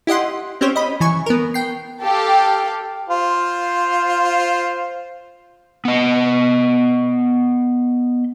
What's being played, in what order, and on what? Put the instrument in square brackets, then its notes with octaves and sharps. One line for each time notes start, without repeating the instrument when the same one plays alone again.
[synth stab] E4 G4 D#5 F#5 C6
C4 C#4 G4 C5 C#5
D#5 B5
E3 G#5 C#6
B3 A#4
G5 C7
[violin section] G4 A4 F5 G5
[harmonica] F4 C5
[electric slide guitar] B3 D#5